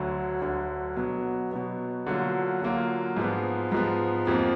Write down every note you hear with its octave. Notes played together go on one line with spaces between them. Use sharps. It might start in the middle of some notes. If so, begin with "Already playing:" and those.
Already playing: D2 D3 F#3
D2 D3 F#3
B2 F#3 B3
B2 F#3 B3
D3 F#3 A#3 F4
D3 F#3 A#3 F4
G#2 F3 B3
G#2 F3 B3
F2 F3 A#3